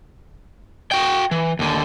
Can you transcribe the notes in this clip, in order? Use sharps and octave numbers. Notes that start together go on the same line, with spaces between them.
F#4 G5
E3
D#2 D3